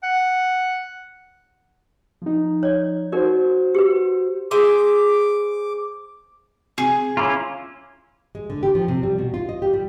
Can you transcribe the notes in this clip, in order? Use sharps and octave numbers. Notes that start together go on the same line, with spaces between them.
F#5
F3 D#4
C#5 D5
D#4 F#4 A#4 C5 D5
G4 B4
G#4 C5 E5 D6
C3 G#4
C#4 E4 F4 A#5 C6 D6
G#3
D3
G4
F3
C3
G3
B2
F4
D#5
G4
G3